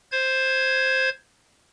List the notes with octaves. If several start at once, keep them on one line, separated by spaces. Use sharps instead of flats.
C5 G#6